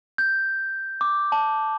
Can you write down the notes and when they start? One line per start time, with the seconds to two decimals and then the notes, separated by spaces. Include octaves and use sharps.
0.18 G6
1.01 D6
1.32 A5